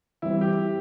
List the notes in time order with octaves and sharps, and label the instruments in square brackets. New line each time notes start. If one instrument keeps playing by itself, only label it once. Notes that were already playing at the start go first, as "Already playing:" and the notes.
[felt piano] E3 G3 C4 [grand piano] E4
[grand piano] G4